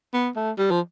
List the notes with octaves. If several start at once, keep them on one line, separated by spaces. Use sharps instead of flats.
B3
A3
G3
F3